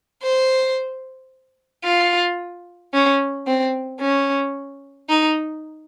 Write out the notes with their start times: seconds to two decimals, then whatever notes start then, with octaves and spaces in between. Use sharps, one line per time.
0.23 C5
1.84 F4
2.93 C#4
3.47 C4
4.01 C#4
5.09 D#4